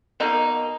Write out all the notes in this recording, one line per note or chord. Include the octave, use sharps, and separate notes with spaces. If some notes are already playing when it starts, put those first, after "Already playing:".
B2 F#3 A#3 D#4